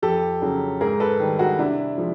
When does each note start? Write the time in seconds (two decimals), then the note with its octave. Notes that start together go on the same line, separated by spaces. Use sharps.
0.02 F2 G4 A4
0.42 C#3 F#3
0.81 G#2 G#4 A#4
1.00 A4 B4
1.19 D#3 G3
1.39 F#4 G#4
1.59 C3 D4 E4
1.98 F3 G#3